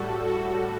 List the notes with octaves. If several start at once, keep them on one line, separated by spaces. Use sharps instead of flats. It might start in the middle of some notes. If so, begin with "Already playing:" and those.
Already playing: A2 G3 F#4 A4
F#4 A4